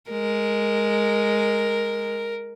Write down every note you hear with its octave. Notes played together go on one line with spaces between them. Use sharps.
G#3 A#4